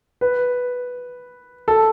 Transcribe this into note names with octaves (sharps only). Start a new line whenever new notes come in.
B4
A4